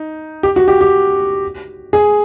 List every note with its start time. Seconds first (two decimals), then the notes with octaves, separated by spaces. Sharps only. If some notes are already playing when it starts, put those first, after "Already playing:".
Already playing: D#4
0.43 G4
0.56 F#4
0.68 G4
0.81 G4
1.93 G#4